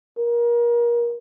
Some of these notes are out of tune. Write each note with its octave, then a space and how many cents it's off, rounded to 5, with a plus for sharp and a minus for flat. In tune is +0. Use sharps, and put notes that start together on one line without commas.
A#4 +30